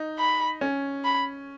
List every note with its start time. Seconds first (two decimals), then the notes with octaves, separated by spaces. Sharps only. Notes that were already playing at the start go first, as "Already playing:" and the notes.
Already playing: D#4
0.19 B5
0.61 C#4
1.05 B5